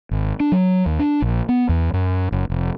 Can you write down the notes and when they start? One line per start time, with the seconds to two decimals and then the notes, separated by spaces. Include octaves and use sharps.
0.11 G#1
0.40 D4
0.52 F#3
0.86 D#2
0.99 D4
1.22 A#1
1.49 B3
1.69 E2
1.93 F#2
2.32 F#1
2.50 F1